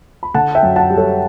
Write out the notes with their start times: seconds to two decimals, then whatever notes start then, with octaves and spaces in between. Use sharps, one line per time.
0.23 B5
0.34 D3 F#5 A5
0.55 E5 G5
0.63 F#2
0.76 F#5 A5
0.90 G3
0.97 A4 C#5